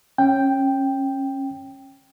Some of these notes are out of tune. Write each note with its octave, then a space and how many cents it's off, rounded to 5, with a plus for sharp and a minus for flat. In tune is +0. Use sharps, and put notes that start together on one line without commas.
C#4 -20 G5 +0